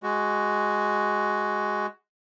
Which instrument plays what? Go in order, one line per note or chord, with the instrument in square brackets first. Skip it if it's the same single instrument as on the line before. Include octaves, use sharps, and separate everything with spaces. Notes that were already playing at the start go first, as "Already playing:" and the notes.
[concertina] G#3 F#4